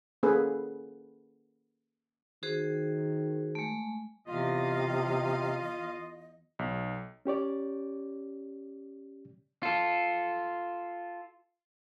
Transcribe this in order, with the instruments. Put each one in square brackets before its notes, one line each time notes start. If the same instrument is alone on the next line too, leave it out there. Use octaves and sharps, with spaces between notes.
[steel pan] A#3 C#4 G#4 A4 B4
[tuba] D#3 [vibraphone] F#4 G#4 C5
[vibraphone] G#3 A3
[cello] E2 F5 [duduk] C3 [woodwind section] F4 D#5
[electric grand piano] B1
[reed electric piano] C#4 G4 C#5 D5
[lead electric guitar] F4 A4